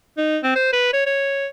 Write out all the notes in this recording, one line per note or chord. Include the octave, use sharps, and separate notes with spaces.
D#4
C4
C5
B4
C#5
C#5